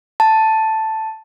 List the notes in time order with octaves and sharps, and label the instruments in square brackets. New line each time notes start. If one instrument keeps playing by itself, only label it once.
[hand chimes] A5